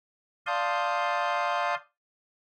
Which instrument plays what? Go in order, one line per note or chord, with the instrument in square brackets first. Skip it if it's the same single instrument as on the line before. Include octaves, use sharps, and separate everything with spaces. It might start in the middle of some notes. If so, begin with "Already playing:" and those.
[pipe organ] D5 F5 A5 C6 D#6 G6